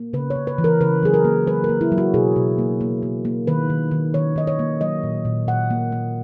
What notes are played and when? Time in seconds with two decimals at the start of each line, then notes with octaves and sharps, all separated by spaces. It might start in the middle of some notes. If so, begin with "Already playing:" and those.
Already playing: A#3
0.13 C#3 B4
0.30 C#5
0.36 C#3
0.47 B4
0.58 E3
0.64 A#4
0.80 C#3 B4
1.03 F#3 G#4
1.14 A#4
1.25 A#3
1.47 F#3 B4
1.64 A#4
1.69 A#3
1.81 E4
1.92 F#3
1.98 F#4
2.14 B2 G#4
2.36 B2
2.59 A#3
2.81 A#3
3.03 A#3
3.25 A#3
3.47 D#3 B4
3.70 D#3
3.91 D#3
4.14 D#3 C#5
4.36 D#3 D#5
4.47 C#5
4.59 A#3
4.81 F#3 D#5
5.03 A#2
5.25 A#2
5.48 A#2 F#5
5.70 A#3
5.92 A#3